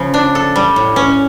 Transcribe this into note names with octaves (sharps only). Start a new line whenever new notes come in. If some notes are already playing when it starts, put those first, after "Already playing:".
Already playing: C#3 F3
D4
A4
G3
A2
C#4